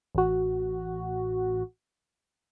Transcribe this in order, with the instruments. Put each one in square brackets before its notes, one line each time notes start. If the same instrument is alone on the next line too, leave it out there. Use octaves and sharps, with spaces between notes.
[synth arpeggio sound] A1 F#4